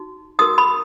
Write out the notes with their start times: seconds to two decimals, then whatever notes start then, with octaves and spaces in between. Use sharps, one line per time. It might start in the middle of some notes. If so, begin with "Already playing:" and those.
Already playing: D#4 F#4
0.39 D#4 F#4 A#4 D#6
0.58 B5